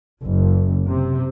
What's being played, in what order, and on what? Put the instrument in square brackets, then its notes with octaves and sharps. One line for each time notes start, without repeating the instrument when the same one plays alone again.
[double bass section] F#1
C3